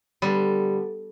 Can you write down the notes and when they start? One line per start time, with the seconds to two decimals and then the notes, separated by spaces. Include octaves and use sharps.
0.22 D3 G3 B3